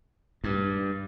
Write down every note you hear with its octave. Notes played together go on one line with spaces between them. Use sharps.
G2